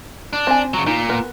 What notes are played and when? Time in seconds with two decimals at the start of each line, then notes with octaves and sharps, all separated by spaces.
0.33 D4
0.47 C4 G#5
0.74 C#3 F#3
0.87 A#2 D#4
1.09 B3 A#4